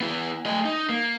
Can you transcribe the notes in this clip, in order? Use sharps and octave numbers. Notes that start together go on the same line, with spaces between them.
B3 E4
A3 D#5
D#4
A#3